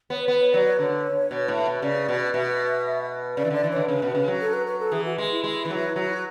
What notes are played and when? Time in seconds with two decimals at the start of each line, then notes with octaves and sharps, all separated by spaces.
0.10 B3 C#5
0.24 C#5
0.28 B3 B4
0.41 C#5
0.53 F#3 D5
0.67 D5
0.79 D3 C#5
1.31 B2
1.48 A2
1.66 B2
1.82 C#3 D5
2.08 B2
2.34 B2 E5
3.37 C#3 D5
3.45 E3
3.50 D3 D5
3.64 E3
3.72 D3 C#5
3.88 C#3 B4
4.02 B2
4.15 C#3
4.28 F#3
4.41 A4
4.54 B4
4.67 B4
4.80 A4
4.92 E3 G#4
5.05 F#4
5.18 G#3
5.31 E4
5.44 G#3
5.65 E3
5.70 F#3
5.96 F#3